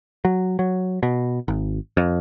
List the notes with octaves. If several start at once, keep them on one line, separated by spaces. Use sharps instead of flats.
F#3
F#3
B2
G#1
F2